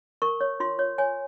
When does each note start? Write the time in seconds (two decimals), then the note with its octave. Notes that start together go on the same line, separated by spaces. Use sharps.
0.22 A#4 C#6
0.41 C#5
0.60 F4 C6
0.79 C#5
0.98 C#5 G#5